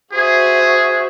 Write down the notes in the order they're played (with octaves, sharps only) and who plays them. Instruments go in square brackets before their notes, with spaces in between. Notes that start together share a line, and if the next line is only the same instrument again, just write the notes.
[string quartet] F#4 C5 E5 [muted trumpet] G#4